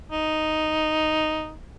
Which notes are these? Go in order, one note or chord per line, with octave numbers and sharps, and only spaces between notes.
D#4